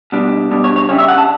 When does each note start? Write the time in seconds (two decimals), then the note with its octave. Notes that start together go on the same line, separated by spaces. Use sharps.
0.12 B2 G3 D4
0.51 B2 G3 D4
0.64 C#5
0.76 C#5
0.89 C#3 G3 C#4 E4 C#5
0.98 E5
1.08 F#5
1.18 A5